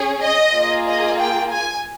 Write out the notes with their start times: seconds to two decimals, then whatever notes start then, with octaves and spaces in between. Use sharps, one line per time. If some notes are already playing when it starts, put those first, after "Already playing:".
Already playing: C#4 G#4
0.22 D#5
0.54 A#3 F4 G#4
0.87 D#5
1.18 G5
1.50 G#5